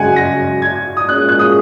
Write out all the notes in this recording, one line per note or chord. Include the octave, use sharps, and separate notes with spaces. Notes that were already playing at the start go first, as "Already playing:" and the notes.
Already playing: F#2 C#3 G#3 F#4 F#5 G#5
A#6
G#6
D#6
A#2 G#3 C#4 G#4 C#5 F#6
F#6
D#6